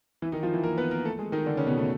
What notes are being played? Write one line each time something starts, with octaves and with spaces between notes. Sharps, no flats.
E3 E4
D#3 D#4
F3 F4
E3 E4
A#3 A#4
B3 B4
A#3 A#4
A3 A4
G#3 G#4
D#3 D#4
D3 D4
C#3 C#4
B2 B3
A3